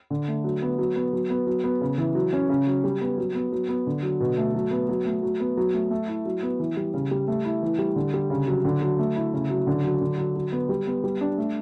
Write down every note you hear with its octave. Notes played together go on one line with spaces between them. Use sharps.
D3
A3
F#3
B3
F#3
B3
F#3
B3
F#3
B3
C#3
E3
F#3
C#4
C#3
F#3
G3
B3
F#3
B3
F#3
B3
D3
F#3
B2
A3
F#3
B3
F#3
A3
F#3
B3
F#3
A3
A3
E4
F#3
B3
E3
G3
C#3
G3
A3
E4
E3
G3
D3
G3
C#3
F#3
D3
F#3
A3
E4
C#3
F#3
D3
F#3
D3
F#3
F#3
B3
G3
B3
G3
D4
A3